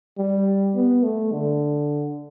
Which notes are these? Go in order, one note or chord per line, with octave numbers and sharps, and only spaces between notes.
G3
B3
A3
D3